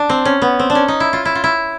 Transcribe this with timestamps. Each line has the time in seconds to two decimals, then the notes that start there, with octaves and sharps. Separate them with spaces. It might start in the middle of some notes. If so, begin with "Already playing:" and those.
Already playing: D4
0.09 C4
0.25 C#4
0.42 B3
0.59 C4
0.70 D4
0.75 C#4
0.88 D#4
1.00 E4
1.13 F4
1.25 E4
1.35 F4
1.44 E4